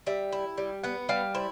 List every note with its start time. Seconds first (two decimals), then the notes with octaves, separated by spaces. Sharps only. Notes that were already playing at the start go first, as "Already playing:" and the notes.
0.07 G3 E5
0.33 E4
0.58 G3
0.83 B3 F#5
1.09 G3 F5
1.35 E4 C5